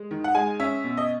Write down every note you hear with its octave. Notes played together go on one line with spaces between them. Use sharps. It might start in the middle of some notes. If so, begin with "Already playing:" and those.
Already playing: G#3
D#3
F#5
G#3 G#5
C#4 E5
B2
D#5